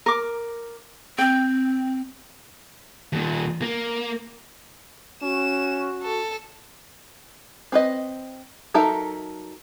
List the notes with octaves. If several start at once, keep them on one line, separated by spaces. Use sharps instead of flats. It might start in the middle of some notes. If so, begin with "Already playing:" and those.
A#4 D6
C4 G5
D#2 A#2
A#3
C#4 F#4 E7
A4
C4 B4 D#5
F#3 D#4 A4 A#4 E5